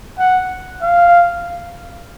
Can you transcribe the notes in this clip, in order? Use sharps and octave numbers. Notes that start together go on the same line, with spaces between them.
F#5
F5